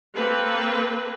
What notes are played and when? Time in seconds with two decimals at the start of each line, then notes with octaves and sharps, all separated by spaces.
0.15 A#3 C4 A4 B4